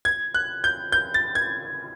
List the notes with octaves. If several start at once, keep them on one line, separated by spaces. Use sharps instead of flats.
G#6
F#6
G6
G6
A6
G#6